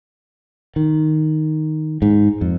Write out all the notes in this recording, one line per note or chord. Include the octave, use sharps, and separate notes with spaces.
D#3
G#2
F2